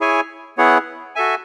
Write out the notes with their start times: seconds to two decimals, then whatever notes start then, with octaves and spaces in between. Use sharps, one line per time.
0.01 E4 G#4 C#5 G#5
0.58 B3 E4 G#4 C#5 F#5
1.16 F#4 A4 E5 G#5